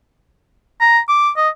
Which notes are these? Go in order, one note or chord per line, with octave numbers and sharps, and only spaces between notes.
A#5
D6
D#5